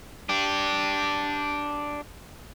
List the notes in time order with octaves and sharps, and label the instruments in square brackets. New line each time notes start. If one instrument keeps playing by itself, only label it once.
[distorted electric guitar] D4 G4